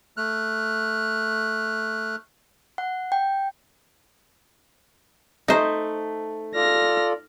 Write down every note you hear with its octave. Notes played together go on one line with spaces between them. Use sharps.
A3 F6 F#6
F#5
G5
A3 D#4 C5
F4 A4 D5 F6 A#6